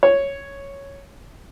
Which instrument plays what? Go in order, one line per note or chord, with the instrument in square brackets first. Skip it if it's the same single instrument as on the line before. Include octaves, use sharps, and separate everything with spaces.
[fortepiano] C#5